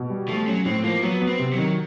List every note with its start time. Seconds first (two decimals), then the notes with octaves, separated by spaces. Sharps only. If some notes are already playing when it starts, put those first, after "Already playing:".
Already playing: B2
0.10 G3
0.28 F3 A3
0.47 F#3 C#4
0.65 A2 C4
0.84 F3 A#3
1.02 F#3 B3
1.21 B3
1.27 C4
1.39 C3
1.53 F#3
1.58 D#3